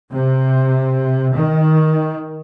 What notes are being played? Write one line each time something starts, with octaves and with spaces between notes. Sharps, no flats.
C3
D#3